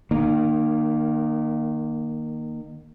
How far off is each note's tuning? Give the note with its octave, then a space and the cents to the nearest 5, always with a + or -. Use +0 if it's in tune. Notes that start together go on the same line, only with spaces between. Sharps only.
D#3 -25 A#3 +0